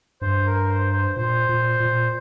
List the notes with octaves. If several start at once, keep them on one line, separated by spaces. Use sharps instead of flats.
G2 C5
A#4
C5
C5
A#2 C5
A#2
A#2